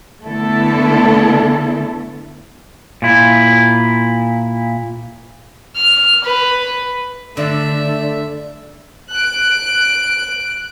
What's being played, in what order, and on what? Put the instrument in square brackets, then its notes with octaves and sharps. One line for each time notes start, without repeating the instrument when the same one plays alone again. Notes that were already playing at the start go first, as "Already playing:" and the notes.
[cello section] D3 A3 B3 E4 A4
[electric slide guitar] A#2 E4
[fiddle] F6
B4
[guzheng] D3 [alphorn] A3 [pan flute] D5 [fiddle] E5
[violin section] F#6 D7